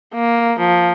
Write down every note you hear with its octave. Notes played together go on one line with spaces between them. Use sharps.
A#3
F3